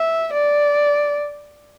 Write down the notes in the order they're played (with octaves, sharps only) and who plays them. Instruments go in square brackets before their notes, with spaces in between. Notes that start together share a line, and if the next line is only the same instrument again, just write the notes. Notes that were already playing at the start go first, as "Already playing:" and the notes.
Already playing: [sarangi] E5
D5